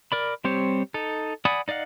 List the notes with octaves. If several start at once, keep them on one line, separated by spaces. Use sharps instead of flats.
A#4 D5 B5
G3 C4 G4 C5 C#5
D#4 A4
D5 F#5 G#5 B5 D#6
D#4 D5 D#5 F5 F#5